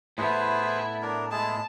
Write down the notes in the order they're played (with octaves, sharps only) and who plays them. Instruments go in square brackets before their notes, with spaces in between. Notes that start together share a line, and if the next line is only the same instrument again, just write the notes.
[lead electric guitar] A2 B3 [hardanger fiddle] E4 [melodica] G#4 B4 C5
[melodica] D4 A#4
[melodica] G#3 E4 G#4 [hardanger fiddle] A5